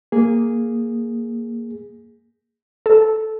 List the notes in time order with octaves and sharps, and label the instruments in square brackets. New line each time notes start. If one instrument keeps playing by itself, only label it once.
[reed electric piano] A#3 G#4
[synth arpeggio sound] A4